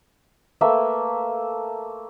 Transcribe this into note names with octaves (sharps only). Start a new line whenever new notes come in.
A3 A#3 B4 E5